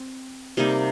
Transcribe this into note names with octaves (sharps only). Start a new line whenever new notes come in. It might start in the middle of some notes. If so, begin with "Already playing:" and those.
Already playing: C4
C3 G3 A#3 D#4